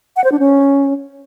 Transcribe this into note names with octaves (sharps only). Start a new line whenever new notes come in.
F#5
C5
D4
C#4